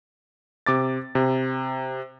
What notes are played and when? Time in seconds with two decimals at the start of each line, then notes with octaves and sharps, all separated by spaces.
0.66 C3 D6 A6
1.15 C3